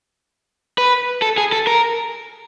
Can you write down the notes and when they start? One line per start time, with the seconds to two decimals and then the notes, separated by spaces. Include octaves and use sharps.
0.78 B4
1.22 A4
1.38 G#4
1.52 A4
1.67 A#4